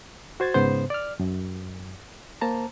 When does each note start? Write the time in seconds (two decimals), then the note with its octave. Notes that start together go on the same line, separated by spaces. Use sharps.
0.40 F#4 C5 G#6 A6
0.54 G#2 C#3 B3 C5
0.90 D5 F6
1.20 F#2
2.41 A#3 C5 A5 A#5